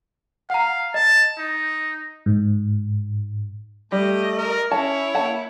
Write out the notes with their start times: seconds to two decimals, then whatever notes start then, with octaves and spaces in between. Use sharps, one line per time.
0.50 F5 F#5 A#5
0.94 D#5 A5
1.38 D#4
2.26 G#2
3.92 G3 A3 G4 D#5
4.38 A#4
4.71 C#4 E4 C#5 A5
5.14 A#3 F#5 A5